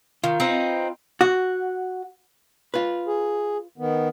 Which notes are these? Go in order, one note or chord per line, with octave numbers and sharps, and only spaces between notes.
D#3 F4
C4 D#4 B4
F#4
F4 B4
G#4
D#3 B3